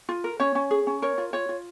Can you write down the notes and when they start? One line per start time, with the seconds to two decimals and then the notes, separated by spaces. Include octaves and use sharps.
0.09 F4
0.24 A#4
0.40 C#4 C#5
0.55 C#4
0.71 G#4
0.87 C#4
1.02 A#4 C#5
1.18 F4
1.33 F4 C#5
1.49 F4